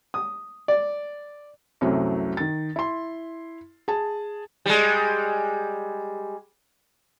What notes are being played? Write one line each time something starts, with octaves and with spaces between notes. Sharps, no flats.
D#6
D5
C2 F#2 C3 F#3 A3
D#3 A6
E4 C6
G#4 A5
G3 G#3